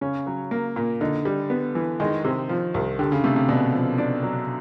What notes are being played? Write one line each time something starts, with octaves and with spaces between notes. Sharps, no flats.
C#3 C#4
F#3
A#3
A#2
D3 D#4
G3
B3
E3
D#3 G#3
C3
F3
C2
D3 G4
C#3
C3 A3
C3
B2 D4
F3
D4
F#3